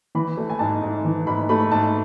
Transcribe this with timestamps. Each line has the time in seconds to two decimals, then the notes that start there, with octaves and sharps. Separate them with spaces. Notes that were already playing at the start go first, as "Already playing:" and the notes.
0.15 E3 B5
0.37 A3
0.50 G#5
0.59 G#2 A5
0.82 G#2
1.04 E3
1.27 G#2 B5
1.49 A3 B5
1.71 G#2 A5